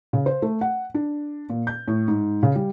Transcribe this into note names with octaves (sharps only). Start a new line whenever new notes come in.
C#3
C5
A3
F#5
D4
A#2
G6
A2
G#2
C#3
G3